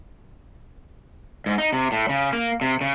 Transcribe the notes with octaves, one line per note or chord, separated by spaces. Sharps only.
G#2
D#4
C3
A2
C#3
A#3
C3
C#3